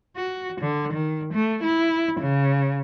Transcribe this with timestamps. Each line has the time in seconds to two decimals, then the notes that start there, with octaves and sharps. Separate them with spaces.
0.16 F#4
0.61 D3
0.93 D#3
1.33 A3
1.64 E4
2.20 C#3